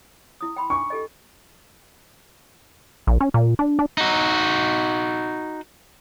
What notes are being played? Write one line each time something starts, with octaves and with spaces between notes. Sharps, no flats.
E4 D#6
G5 B5 C6
D4 G#5 C#6 D6
G4 A4 D#5
A#1
C#4
A#2
D4
D4
D#4 F#4